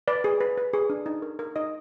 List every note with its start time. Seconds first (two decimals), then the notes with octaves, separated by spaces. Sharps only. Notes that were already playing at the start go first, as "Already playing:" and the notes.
0.08 B4 D5
0.24 G#4
0.40 B4
0.58 B4
0.73 G#4
0.90 D4
1.06 D#4
1.22 A#4
1.39 A#4
1.56 D#4 D#5